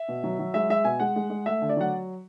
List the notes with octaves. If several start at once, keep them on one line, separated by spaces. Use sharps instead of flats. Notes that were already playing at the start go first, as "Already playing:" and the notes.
Already playing: E5
B2
F#3
F#3
G#3 E5
G#3 E5
B2 G#5
G#3 F#5
G#3
G#3
A3 E5
D3
D5
F#3 F#5